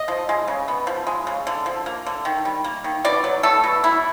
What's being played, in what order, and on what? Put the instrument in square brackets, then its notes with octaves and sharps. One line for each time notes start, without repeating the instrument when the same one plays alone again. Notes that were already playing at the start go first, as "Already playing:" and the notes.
Already playing: [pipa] D#5
F3
G#3
C#3
B3
F3
G#3
C#3
D3
F3
A#3
D3
D#3
G3
A#3
D#3
B2 D5
F#3
A3 A4
B2
E3 E4